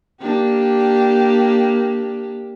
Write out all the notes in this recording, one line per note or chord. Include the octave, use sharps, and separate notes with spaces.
A#3 D4 G4